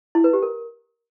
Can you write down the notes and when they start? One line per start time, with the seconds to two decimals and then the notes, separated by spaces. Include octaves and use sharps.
0.15 E4
0.24 B4
0.33 G4
0.43 A#4